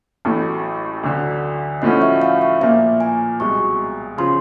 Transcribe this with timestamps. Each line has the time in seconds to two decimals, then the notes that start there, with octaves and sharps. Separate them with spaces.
0.25 A1 A2 F#3 A3
1.03 D2 D3 F#3
1.82 A2 F3 A3 C#4 F#4 D#5
2.02 E5
2.22 F5
2.41 E5
2.61 A#2 F3 A#3 E5
3.00 G#5
3.40 C2 B2 G#3 C#6
4.18 C#3 F3 C6